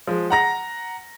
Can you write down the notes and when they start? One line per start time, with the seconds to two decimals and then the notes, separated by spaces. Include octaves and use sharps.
0.07 F3 G#3
0.30 F#5 A#5 A#6